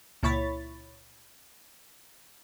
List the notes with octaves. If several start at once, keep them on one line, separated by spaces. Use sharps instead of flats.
C#2 A#2 E4 C#5 B5 A6